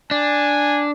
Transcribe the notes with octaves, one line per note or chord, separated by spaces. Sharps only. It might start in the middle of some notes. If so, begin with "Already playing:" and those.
D4 G#5